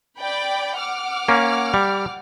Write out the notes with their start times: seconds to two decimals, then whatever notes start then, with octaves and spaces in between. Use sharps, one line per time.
0.18 D5 G5 B5
0.79 F#5 D6 F6
1.28 A#3 C#4
1.74 G3